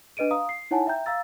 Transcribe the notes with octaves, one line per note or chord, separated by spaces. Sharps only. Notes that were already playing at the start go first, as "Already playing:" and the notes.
D4 B4 D#5 D7 D#7
F5 A#5 D#6
C7
D#4 E4 C#5 F#5 G#5 A5
E5 G5 A#5 G6
F5 A#5 E6 A6